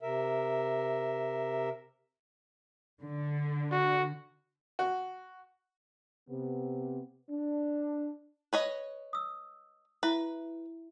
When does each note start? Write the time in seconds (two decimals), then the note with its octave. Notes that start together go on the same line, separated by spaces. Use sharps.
0.02 C3 A#4 E5
3.03 D3
3.71 F#4
4.79 F#4
6.29 C3 B3
7.30 D4
8.53 B4 C#5 D#5
9.13 D#6 E6
10.03 E4 B4 E5